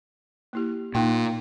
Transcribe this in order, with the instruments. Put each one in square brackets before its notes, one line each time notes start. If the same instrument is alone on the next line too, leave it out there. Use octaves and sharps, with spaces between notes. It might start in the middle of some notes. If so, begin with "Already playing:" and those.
[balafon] A#3 E4 G4
[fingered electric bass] A#2 [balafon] A#3 D#4 G5